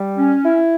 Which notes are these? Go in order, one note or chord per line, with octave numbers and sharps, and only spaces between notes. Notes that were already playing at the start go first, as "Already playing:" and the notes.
Already playing: G3
C#4
E4